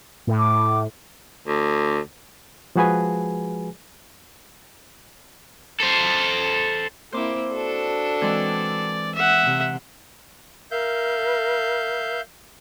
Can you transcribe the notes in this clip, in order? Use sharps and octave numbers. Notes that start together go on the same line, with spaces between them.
A2
D6
D2
F3 G#3 F#4 G#4 B4 G#5
A4 C5
A#3 C4 E4 C5 D6
D4 F#4 A4
E3 G#3 C4 D5
E5 F#5
C3
A#4 E5 F5 G6